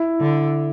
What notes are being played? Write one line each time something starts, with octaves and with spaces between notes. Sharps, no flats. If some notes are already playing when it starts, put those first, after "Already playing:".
Already playing: E4
D3